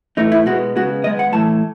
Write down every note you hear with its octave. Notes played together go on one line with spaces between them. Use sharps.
A2 E3 A3 D#4
E4
B2 G#3 B3 F#4
C#3 G#3 B3 F#4
D#3 G#3 B3 D#5
F#5
A2 E3 A3 A5